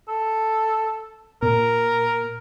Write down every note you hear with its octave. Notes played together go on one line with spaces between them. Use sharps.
A4
A#2 A#4